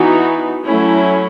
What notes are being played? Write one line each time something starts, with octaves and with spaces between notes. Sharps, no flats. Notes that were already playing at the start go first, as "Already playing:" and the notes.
Already playing: E3 B3 D#4 F#4
F#3 A3 C#4 E4